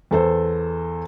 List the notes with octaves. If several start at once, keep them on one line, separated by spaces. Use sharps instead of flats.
E2 A4 C5